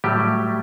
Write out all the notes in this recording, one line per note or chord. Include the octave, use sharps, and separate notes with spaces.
A2 F#3 G3 A3 G4